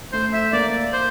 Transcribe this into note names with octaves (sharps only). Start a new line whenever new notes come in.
A3 C5
E5
A#3 D5
C5